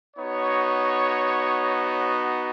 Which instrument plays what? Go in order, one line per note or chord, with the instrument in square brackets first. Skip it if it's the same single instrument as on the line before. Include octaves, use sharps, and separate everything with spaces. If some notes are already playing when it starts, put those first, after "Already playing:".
[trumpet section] B3 D#4 F#4 C#5